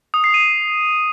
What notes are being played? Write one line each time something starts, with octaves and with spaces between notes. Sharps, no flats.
D#6
C7
D#7